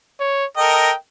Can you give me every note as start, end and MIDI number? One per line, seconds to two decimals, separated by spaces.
0.20 0.45 73
0.57 0.91 69
0.57 0.91 70
0.57 0.91 75
0.57 0.96 79